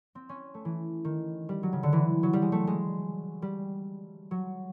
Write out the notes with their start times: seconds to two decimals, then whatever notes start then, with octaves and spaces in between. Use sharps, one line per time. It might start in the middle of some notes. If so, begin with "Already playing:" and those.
0.15 C4
0.29 C#4
0.54 A3
0.65 E3
1.05 D#3
1.49 G3
1.63 F#3
1.73 C#3
1.83 D3
1.93 E3
2.23 F#3
2.33 G3
2.42 G#3
2.52 A3
2.67 G#3
3.42 G3
4.31 F#3